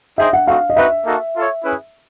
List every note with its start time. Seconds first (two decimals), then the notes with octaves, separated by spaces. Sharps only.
0.18 D#4 G#4 C5 D#5 E5 G5
0.33 F#5
0.47 A3 C4 D#4 F#4 F5
0.70 D#5
0.76 C4 D#4 F#4 B4 E5
1.05 A#3 D#4 F#4 A4
1.35 F4 A4 C#5
1.63 C#4 E4 G#4 B4